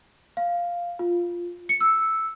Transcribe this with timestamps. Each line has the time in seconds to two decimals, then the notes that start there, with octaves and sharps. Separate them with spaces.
0.37 F5
0.99 F4
1.69 C#7
1.81 E6